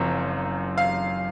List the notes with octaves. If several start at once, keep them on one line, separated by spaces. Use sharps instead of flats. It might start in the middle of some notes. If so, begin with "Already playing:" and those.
Already playing: F#1 F#2 F3 C4
F5